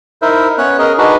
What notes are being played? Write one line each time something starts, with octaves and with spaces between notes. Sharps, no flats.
D#4 E4 A#4 C5 E5
B3 C#4 C#5 F#6
C#4 G#4 A#4 D#5
D4 D#4 F#4 G#4 B4 D#5